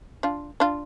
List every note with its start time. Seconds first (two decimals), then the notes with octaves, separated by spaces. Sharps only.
0.23 D4 F4
0.60 D4 F4